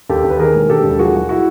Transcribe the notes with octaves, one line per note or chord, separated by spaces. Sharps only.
D#2 G4 A4
D#2
B4
D#3 G#4 A#4
E1
E1 G4 A4
D#2
F3 F#4 G#4
B1
E4 F#4